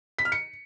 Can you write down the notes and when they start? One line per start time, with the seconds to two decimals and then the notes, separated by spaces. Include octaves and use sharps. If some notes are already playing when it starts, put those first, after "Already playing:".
0.19 B6
0.25 F6
0.32 C#7